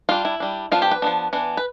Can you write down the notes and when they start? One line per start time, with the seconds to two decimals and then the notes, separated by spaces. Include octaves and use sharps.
0.09 G3 D4 F4
0.25 E4
0.40 G3 D4
0.71 F3 B3 D4 F4
0.82 G4
0.91 B4
1.02 F3 B3 D4
1.33 E3 B3 D4
1.57 B4